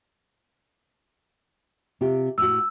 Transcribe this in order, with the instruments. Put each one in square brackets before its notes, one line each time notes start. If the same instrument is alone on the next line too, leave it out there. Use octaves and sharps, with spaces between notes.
[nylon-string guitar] C3 F4 G4
[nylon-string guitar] A2 F#4 [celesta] E6